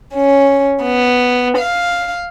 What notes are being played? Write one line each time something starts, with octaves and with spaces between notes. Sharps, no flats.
C#4
B3
F5